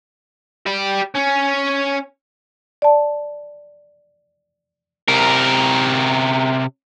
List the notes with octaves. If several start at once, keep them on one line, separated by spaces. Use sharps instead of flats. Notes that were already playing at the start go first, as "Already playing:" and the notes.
G4 D5
C#4
D5 A5
C3 A#4